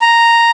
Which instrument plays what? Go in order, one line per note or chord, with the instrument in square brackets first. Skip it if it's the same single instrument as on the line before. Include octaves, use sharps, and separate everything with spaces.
[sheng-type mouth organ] A#5